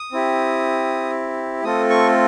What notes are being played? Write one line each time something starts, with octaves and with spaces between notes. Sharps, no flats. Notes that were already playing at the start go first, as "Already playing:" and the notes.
Already playing: D#6
C4 E4 G4
A3 C4 F4 A4 D#6
C#6